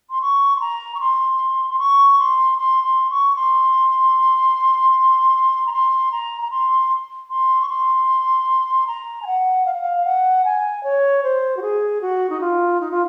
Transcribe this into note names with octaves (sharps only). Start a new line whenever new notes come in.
C6
C#6
C6
A#5
C#6
C6
C6
C#6
C6
C6
C6
C#6
C6
A#5
C6
A#5
A#5
C6
C6
C#6
C6
A#5
G#5
F#5
F5
F#5
F5
F#5
G#5
C#5
C5
F#4
G#4
F#4
D#4
F4
D#4
F4